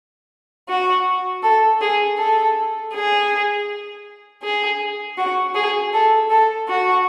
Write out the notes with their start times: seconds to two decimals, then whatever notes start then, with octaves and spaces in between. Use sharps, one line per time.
0.68 F#4
1.42 A4
1.81 G#4
2.18 A4
2.93 G#4
4.42 G#4
5.18 F#4
5.54 G#4
5.93 A4
6.30 A4
6.68 F#4